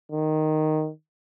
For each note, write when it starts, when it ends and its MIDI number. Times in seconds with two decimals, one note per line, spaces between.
0.12 0.90 51